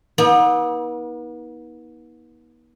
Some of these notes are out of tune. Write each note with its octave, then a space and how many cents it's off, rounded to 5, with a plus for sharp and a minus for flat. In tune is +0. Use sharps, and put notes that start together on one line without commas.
B3 -40 D#4 +40